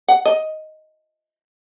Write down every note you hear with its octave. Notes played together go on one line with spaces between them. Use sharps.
F#5
D#5